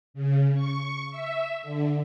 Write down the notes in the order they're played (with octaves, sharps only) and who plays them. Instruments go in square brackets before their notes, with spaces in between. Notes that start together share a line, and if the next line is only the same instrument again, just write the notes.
[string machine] C#3
C#6
E5
D3